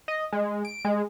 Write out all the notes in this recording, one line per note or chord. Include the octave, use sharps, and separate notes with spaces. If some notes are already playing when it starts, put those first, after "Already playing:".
D#5
G#3
D7
G#3